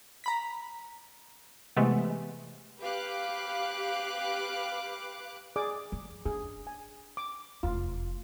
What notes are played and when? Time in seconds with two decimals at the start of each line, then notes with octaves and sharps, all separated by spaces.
0.24 A#5 B5 B6
1.76 C3 E3 G#3 A3 B3
2.80 G4 B4 F5 D6 F#6
5.56 G#4 D5 D6
5.92 F#3
6.26 D4 G#4
6.67 G#5
7.17 D6
7.63 F1 E2 F4